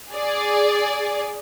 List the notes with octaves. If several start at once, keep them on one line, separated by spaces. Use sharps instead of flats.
G#4 D5